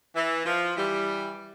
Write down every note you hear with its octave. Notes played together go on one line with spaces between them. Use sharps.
E3
F3
E3 G3